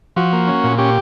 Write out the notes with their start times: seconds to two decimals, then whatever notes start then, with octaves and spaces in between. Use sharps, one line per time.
0.16 F3 F#4
0.33 A#3
0.48 C#4
0.64 A#2
0.78 C#4 G4